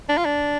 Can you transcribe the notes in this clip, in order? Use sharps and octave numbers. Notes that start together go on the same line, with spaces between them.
D4
F4
D4